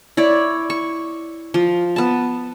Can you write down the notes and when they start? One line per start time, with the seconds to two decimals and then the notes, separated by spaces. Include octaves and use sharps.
0.17 E4 C#5 D5
0.70 C#6
1.54 F3
1.96 B3 A5